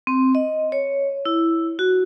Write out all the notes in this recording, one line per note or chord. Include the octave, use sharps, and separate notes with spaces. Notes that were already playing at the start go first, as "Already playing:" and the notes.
C4
D#5
C#5
E4
F#4